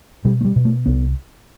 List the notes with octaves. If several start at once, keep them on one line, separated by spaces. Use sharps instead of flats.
B2 G3
A3
G3
B2
A3
C2 B3